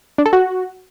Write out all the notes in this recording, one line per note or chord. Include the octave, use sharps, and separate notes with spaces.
D4
A4
F#4